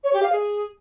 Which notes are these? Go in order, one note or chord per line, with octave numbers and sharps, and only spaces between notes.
C#5
G4
F5
G#4